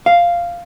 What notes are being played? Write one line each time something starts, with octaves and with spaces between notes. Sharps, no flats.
F5